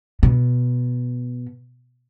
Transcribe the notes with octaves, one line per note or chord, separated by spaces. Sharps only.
B2